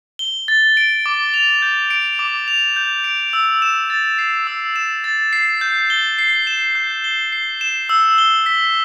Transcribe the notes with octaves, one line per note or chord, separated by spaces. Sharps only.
G7
A6
D7
D6
F7
G6
D7
D6
F7
G6
D7
E6
E7
A6
C7
E6
E7
A6
C7
G6
G7
C7
E7
G6
G7
C7
E7
E6
G7
B6